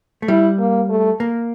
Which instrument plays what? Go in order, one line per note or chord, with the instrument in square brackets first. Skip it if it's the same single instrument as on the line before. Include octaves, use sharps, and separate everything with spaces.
[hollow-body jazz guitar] A3
[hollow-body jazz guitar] G3 [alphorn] E4
[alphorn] A#3
A3
[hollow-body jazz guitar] A#3